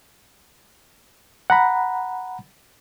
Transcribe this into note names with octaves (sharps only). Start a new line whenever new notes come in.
F#5 A#5 B5